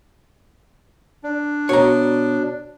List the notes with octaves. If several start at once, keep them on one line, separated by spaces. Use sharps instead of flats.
D4
B2 C#5 A#5